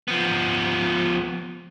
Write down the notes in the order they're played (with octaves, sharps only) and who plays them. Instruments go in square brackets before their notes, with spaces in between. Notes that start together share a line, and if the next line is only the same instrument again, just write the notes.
[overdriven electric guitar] F3 B3